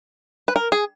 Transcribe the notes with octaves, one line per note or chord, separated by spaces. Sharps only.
B4
A#4
G#4